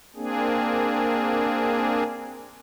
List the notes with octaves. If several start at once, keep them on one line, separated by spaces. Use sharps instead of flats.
A#3 C4 D4 G#4